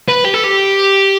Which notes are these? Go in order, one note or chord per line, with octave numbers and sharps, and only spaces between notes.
B4
G4
A4
G4